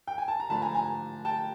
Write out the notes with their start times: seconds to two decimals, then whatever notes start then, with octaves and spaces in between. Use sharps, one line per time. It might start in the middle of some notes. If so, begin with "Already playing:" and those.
0.08 G5
0.18 G#5
0.28 A5
0.40 A#5
0.49 D3 F3 A3 D4 A5 B5
0.62 G#5 A#5
0.75 G#5 A#5
1.25 G5 A5